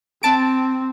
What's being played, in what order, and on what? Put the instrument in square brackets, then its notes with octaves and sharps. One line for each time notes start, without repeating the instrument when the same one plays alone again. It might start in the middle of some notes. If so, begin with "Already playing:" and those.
[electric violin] C4 [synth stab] A5 D7